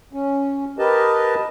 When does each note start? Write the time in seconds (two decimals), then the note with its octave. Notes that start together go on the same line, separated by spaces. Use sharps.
0.13 C#4
0.79 G4 A#4 B4 D#5 A5